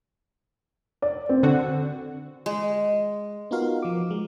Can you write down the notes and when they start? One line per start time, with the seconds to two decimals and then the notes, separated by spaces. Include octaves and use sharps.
1.02 D5
1.29 C4
1.43 D3 F#4
2.46 G#3
3.51 B3 D#4 F4 F#4 A#4 F5
3.82 F3 D6
4.11 G#3